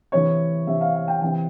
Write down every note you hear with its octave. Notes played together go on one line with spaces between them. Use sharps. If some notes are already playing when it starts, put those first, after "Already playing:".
C3 E3 C#5
C3 E3 E5
F5
F5
G5
C3 E3 G5